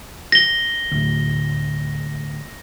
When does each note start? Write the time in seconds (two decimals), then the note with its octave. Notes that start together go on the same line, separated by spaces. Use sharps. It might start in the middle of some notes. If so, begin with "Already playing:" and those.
0.32 A#6 G7
0.91 D2 A2